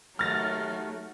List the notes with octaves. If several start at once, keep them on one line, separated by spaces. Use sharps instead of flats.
D#2 F#3 A3 F6 A6 A#6